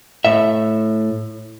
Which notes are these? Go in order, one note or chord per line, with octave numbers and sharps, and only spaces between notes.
A2 E5